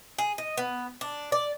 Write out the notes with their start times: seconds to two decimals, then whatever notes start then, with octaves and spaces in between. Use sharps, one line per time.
0.19 G#4
0.38 D#5
0.58 B3
1.01 D4
1.32 D5